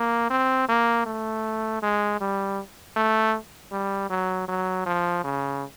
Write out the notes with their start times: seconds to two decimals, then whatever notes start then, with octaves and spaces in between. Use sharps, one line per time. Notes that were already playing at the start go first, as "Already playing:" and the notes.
Already playing: A#3
0.30 C4
0.69 A#3
1.06 A3
1.83 G#3
2.20 G3
2.96 A3
3.72 G3
4.10 F#3
4.48 F#3
4.86 F3
5.24 C#3